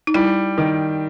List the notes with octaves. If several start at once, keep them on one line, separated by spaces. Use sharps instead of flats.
D#4
G3 E4
D#3